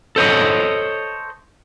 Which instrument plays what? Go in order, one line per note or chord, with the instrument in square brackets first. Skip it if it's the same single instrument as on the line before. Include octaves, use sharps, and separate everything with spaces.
[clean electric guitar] A4 C5 C#5 D#5